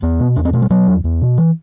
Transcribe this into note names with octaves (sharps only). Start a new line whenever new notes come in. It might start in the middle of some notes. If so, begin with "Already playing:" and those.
E2 B3
B2
E2 D4
C4
B2 A3
G3
B2 F#3
E2
E2
B2
E3